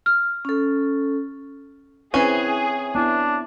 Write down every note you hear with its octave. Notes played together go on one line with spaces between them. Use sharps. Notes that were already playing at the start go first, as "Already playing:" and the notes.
F6
C#4 A4
E3 C4 C#4 E4 G#4
B3 D4 E4